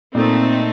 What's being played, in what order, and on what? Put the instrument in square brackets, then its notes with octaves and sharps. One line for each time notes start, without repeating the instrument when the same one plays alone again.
[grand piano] A#2 [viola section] A3 C4 D#4